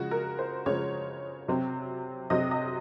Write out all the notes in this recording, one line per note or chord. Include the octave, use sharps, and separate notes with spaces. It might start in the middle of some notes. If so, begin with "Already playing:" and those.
Already playing: C#3 F3 G#3 F#4
A#4
C5
C#3 F3 G#3 C#5
C3 F#3 C4
C3 F#3 C4 D#5
D#5